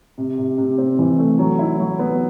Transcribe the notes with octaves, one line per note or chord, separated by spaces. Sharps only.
C3
C3
C3
C4
E3
A3
F#3
E4
F#3
B3